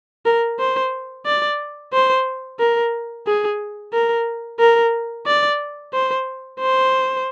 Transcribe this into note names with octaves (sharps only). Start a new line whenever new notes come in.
A#4
C5
D5
C5
A#4
G#4
A#4
A#4
D5
C5
C5